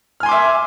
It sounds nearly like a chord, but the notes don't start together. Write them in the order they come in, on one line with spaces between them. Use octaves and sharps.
F6 G#5 C6 D6 E5